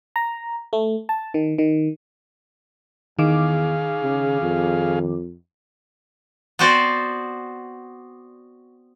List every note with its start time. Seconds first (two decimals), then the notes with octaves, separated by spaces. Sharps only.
0.16 A#5
0.73 A3
1.09 A5
1.34 D#3
1.58 D#3
3.19 E2 D#3 G#4 F5 D6
4.03 C#3
4.41 F2
6.59 B3 C4 F#4 C5 D5